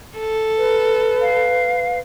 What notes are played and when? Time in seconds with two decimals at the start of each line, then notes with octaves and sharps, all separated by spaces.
0.18 A4
0.58 B4
1.21 F5